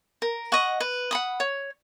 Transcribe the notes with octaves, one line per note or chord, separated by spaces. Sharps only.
A#4
D#5 F#5 C#6
B4
F#5 B5 D#6
C#5